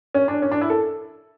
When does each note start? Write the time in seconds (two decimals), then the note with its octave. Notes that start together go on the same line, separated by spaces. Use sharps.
0.14 C#4
0.28 D4
0.42 C#4
0.52 D4
0.61 E4
0.70 A4